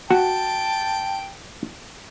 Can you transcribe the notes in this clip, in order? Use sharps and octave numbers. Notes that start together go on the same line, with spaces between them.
F#4 G5 A5